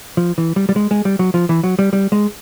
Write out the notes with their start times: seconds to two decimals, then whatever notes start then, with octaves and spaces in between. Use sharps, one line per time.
0.17 F3
0.38 E3
0.56 G3
0.69 G3
0.76 G#3
0.91 G#3
1.05 G3
1.19 F#3
1.34 F3
1.49 E3
1.64 F#3
1.79 G3
1.93 G3
2.12 G#3